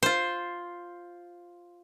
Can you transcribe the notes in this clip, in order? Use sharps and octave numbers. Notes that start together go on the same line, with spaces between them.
F4 C5